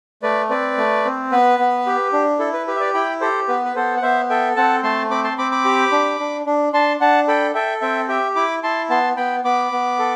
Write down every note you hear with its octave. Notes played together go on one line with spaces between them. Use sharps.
A3 B4 D5
C4 B4 D5
A3
C4
B3 B4
B3
G4
D4
E4 A4
B4
G4 B4
E5
B4 D5
E4 G5 B5
G4 A4 C5
B3 B4
B4
B3 A4 C5
F#5
B3 C5 E5
A4 E5 G5
C4 F#5 A5
A3 A5 C6
C4 B5 D6
A5 C6
C4 B5 D6
B5 D6
G4
D4
D4
D4
D4 A5 C6
D4 F#5 A5
A4 G5 B5
A4 E5 G5
C4 E5 G5
G4 E5 G5
E4 B5 D6
E4 A5 C6
B3 A5 C6
B3 G5 B5
B3 B5 D6
B3
A4